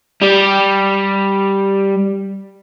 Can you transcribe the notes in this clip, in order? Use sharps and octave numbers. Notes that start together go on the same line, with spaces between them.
G3 G4